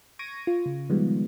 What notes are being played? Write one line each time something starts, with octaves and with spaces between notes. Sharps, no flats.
C#6 G#6 A#6 D7 D#7
F4
C#3
D#3 F3 G3 G#3 B3